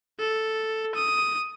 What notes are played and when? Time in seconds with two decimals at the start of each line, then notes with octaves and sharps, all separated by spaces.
0.19 A4
0.95 D#6